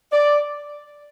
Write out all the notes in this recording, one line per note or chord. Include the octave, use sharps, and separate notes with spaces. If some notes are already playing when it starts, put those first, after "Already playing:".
D5